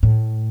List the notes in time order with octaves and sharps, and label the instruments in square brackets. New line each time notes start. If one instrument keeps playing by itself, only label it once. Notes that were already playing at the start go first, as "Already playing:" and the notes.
[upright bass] A2